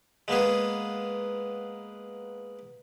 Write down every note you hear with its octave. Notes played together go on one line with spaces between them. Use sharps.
G#3 A#3 B3 G#4